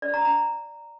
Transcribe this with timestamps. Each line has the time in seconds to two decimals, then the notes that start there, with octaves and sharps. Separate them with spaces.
0.02 D5
0.14 A#5
0.25 A#5